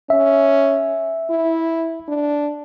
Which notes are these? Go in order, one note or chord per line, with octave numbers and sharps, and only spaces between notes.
C#4 E5
E4
D4